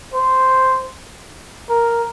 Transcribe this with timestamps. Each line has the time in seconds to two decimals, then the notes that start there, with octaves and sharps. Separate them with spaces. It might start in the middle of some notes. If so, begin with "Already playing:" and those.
0.14 C5
1.70 A#4